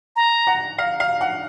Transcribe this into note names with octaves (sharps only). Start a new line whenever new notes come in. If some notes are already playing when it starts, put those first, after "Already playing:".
A#5
F#5
F5
F5
F#5